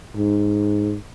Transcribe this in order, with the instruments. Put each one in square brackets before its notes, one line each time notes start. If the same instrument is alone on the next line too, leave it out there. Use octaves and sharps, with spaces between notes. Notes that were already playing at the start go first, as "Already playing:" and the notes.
[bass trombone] G#2